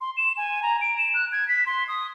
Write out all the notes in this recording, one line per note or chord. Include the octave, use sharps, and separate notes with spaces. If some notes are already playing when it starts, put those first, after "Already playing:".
C6
E7
G#5
A#5
D7
E7
F#6
G#6
B6
C6
D#6